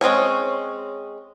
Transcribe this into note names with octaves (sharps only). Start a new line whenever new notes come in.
G#3 C4 C#4 C#5